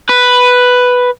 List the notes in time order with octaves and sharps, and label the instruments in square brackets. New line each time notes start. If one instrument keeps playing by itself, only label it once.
[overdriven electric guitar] B4